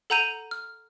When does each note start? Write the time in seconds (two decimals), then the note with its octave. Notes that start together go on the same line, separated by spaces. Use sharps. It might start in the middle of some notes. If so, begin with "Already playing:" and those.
0.10 A4 F#5 A#5 G6 D#7 F7
0.51 F6